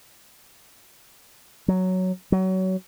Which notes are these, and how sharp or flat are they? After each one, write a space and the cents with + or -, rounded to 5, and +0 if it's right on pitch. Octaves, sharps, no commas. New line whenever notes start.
F#3 +5
F#3 +25